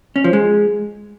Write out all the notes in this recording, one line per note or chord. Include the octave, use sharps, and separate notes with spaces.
C#4
F3
G#3